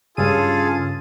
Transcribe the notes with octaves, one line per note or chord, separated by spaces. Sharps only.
G2 C#3 F4 G#4 A4 D#7